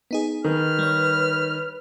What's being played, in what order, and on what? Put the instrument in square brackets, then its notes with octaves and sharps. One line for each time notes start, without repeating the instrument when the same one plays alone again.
[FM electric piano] B3 D#4 G#4
[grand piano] D#3 [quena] B4 [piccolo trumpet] F6
[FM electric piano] G3 C#5